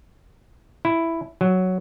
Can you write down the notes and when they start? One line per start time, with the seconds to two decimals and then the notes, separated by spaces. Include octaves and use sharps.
0.85 E4
1.41 F#3